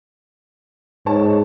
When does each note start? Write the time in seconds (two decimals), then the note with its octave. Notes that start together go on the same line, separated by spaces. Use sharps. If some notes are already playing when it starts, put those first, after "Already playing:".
1.06 G#2 C#5 A5